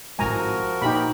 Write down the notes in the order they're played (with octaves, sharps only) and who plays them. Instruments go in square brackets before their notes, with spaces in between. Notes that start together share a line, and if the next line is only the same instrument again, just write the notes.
[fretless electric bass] G#1 A2 G#3 [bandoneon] F3 F#4 A#4 [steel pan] G#5 A#5
[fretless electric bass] A#2 [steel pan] D#4 G4 B5